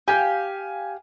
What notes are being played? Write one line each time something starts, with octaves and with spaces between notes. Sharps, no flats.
G4 F5 G#5